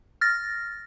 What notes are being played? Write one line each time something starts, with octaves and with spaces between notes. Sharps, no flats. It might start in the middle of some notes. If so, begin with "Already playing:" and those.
F6 A6 A#6